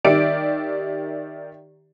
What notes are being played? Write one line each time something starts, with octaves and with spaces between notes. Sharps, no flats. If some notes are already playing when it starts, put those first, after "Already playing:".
D#3 G4 D5 E5 D7